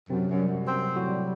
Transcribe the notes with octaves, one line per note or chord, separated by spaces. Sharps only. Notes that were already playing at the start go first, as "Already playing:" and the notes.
F#2 C3 C4
F#2
G3
F#2
C4
A2
F#3 F#4
G3